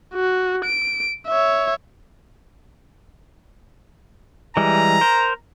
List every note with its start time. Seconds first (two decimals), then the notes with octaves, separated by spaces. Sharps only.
0.14 F#4
0.65 D7
1.28 C#5 E5
4.57 E3 G3 G#3 A#5
5.01 A#4 C5